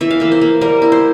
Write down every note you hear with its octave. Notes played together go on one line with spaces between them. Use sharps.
E3 E5
F5
A#3 E5
C5
A#3
G3 A#4
E4
C5